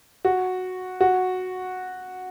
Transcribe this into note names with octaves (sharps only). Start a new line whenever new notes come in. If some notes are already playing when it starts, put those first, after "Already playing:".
F#4
F#4